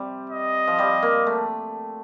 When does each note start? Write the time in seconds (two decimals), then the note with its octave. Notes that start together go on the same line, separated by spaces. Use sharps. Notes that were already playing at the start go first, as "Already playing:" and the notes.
Already playing: C3 G3
0.30 D#5
0.68 F3
0.79 G3
1.02 A#3
1.27 A3